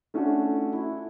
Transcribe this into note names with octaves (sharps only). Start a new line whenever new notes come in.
A3 C#4 D4 F4 F#4 A4
E4